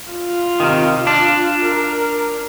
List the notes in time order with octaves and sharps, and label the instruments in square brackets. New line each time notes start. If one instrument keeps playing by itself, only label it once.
[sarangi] F4
[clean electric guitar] C3 D#3
D4
[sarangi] A#4